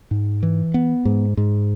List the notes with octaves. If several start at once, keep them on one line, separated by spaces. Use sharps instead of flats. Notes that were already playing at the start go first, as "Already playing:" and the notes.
G#2
E3
B3
G#2
G#2